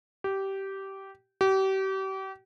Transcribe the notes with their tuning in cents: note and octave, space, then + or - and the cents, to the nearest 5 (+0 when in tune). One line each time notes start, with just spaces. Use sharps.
G4 -15
G4 -35